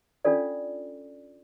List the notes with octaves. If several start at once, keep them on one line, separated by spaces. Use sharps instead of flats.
C#4 D4 F4 A4 D5